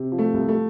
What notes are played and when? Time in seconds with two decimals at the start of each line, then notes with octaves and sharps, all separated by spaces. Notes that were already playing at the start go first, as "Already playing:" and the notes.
Already playing: C3
0.12 F3
0.19 A3
0.33 C2
0.49 A3